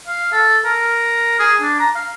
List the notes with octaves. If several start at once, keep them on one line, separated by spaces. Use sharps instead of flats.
F5
A4
A#4
G#4
D4
A#5
F5